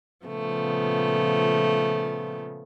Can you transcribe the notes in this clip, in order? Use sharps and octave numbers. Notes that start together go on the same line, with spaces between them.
A#2 C#3 F3 A3 B3